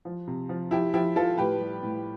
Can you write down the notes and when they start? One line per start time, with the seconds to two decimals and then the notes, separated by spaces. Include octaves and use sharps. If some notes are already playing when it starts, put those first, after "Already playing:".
0.05 F3
0.27 C3
0.49 F3
0.71 F3 E4 G4
0.94 F3 E4 G4
1.16 F3 F4 A4
1.38 A2 G4 B4
1.60 G3
1.83 A2